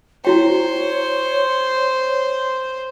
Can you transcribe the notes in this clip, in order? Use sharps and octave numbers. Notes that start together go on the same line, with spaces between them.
E4 F#4 C5 C#5 G5